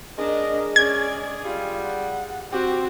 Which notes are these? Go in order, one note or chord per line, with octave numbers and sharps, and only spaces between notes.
G#3 D4 A#4 D#5
C#4 G#4 D5 G#6
G3 F4
F#5
C4 F#4 G4